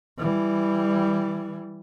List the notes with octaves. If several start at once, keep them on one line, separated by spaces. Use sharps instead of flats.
E3 G3